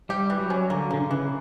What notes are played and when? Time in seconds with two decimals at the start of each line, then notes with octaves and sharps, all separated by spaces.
0.09 G3 G4
0.30 E3
0.39 F#3
0.50 C#4
0.70 D3 A#3
0.91 D3 A#3
1.01 C#3
1.11 E3